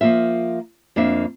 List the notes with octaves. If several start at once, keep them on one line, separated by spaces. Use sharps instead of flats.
F3 A#3 F4 E5
F2 A#3 D4 E5